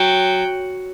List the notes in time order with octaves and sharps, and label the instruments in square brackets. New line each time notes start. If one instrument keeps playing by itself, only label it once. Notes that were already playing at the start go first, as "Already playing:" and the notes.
Already playing: [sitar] F#3 [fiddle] G5